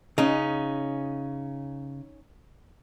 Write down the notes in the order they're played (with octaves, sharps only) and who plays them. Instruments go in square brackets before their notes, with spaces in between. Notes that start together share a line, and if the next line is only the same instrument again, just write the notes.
[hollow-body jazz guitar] C#3 [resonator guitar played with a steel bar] C#4 D#4